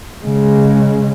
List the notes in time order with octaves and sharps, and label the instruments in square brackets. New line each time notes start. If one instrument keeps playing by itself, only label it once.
[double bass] C#3 G#3